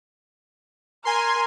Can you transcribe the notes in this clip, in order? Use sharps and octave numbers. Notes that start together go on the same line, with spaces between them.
A#4 G#5 C6